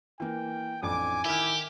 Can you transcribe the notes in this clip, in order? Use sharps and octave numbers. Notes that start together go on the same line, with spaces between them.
E3 A#3 G5
A1 F2 D4 G#5 D6
D#3 E4 G4 F6